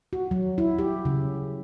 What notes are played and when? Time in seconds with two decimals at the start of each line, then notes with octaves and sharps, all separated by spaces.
0.13 F#4
0.31 F#3
0.58 E4
0.79 G4
1.05 C#3